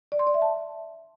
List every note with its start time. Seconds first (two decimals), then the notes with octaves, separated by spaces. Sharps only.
0.12 D5
0.19 C6
0.27 D5
0.34 E5
0.42 A5